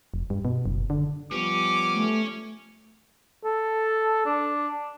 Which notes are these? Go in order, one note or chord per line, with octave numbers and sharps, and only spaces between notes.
F1
G2
B2
F#1
D3
F3 G3 B3 C#4 D6
A3
A4
D4